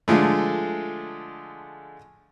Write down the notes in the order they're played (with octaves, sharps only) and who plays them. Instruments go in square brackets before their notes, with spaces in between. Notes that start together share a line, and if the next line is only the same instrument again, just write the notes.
[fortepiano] D3 F3 G#3 A3